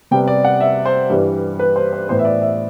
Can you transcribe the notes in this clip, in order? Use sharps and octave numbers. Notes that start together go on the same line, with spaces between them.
C3 G3 B3 G5
D5
F#5
E5
C5
G2 E3 G3
B4
C5
C5
A2 E3 B3 C5
E5
D5
E5